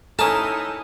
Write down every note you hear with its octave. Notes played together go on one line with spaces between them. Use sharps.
C#4 D#4 E4 A4 A#4 A5 D#6